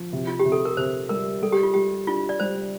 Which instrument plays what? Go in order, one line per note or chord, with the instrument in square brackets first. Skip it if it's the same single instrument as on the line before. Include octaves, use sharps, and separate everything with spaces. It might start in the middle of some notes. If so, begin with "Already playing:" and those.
Already playing: [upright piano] F3
C3
[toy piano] F4
G4
[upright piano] C3
[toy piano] A4
A#4
[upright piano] C3 [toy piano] C5
[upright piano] G3 [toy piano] A#4
[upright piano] G3 [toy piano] A4
[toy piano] G4
F4
[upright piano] G3 [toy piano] G4
[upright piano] D4 [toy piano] F4
[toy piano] D5
[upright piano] G3 [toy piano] C5